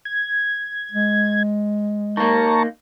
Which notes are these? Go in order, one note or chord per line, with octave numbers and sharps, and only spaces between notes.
G#6
G#3
D#3 A#3 A5 A#5 C#6